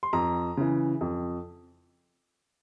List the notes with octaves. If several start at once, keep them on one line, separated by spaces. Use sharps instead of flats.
C6
F2 A#5
C#3 E3
F2